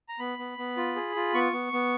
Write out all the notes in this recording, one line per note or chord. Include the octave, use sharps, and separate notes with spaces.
A#5
B3 B5
B3
B3
F4
G#4
F4
B3 C#6
B3
B3